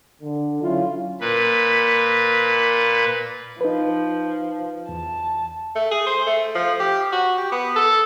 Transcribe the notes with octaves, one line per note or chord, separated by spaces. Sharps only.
D3
F#3 C#4 E4 F4
A#2 B4
F3 D#4 B4
E2 A5
A3
G#4
C5
A3
F3
G4
F#4
G4
B3
A4